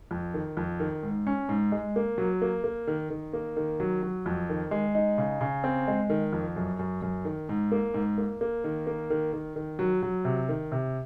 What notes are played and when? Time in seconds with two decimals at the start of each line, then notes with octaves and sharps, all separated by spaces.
0.11 F2
0.34 D#3
0.57 F2
0.80 D#3
1.03 G#2
1.27 C#4
1.49 G#2
1.72 G#3
1.96 A#3
2.18 F#3
2.42 A#3
2.64 A#3
2.87 D#3
3.10 D#3
3.33 A#3
3.56 D#3
3.80 F#3
4.03 F#3
4.26 F2
4.49 D#3
4.71 G#3
4.95 D#4
5.18 C#3
5.41 C#3
5.64 C4
5.88 G#3
6.10 D#3
6.33 F2
6.56 F#2
6.79 F#2
7.02 F#2
7.25 D#3
7.49 G#2
7.72 A#3
7.94 G#2
8.18 A#3
8.41 A#3
8.64 D#3
8.87 A#3
9.10 D#3
9.33 D#3
9.56 D#3
9.79 F#3
10.03 F#3
10.25 C3
10.49 D#3
10.72 C3